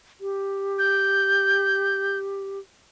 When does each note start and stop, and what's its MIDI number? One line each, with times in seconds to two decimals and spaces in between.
0.21 2.59 67
0.79 2.18 91